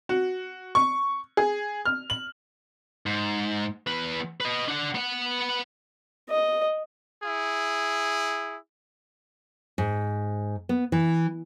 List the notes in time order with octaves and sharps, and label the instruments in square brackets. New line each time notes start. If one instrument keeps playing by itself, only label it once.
[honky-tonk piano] F#4
C#6
G#4
F6
F#7
[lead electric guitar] G#2
E2 B4
B4 D#5
D4 F#5
B3 F#5
[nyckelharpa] D#5
[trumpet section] E4 G#4
[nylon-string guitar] G#2
B3
E3